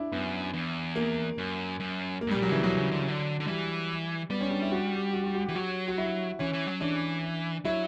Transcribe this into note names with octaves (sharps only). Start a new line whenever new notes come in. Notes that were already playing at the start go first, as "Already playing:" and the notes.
Already playing: D4 E4
F#2 B3
E2
A#3
F#2
F#2
A#3
G2
G3
A#2
F#3
C#3 E3
B2 F#3
C#3
D3
C#3
D3
D3
E3 G3
G3 B3
C#4
D4
E4
F#4
G4
F#4
F#4
F#4
G4
E3
F#3 F#4
F#4
E4
E3 C#4
E3
F#3
E3 D4
F#3 E4